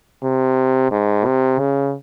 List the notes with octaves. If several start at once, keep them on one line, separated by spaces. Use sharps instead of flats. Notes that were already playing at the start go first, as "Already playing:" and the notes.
C3
G#2
C3
C#3